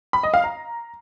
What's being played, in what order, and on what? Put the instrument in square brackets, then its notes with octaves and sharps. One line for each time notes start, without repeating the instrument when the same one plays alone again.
[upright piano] B5
D#5
F5
A#5